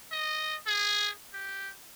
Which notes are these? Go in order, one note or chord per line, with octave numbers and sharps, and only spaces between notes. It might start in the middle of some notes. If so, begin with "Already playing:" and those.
D#5
G#4
G4